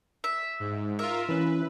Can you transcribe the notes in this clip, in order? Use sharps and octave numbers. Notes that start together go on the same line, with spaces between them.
E5
G#2
F4 A#4 E5
E3 C#4 B4